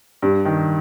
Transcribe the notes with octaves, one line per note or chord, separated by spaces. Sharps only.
G2
D#3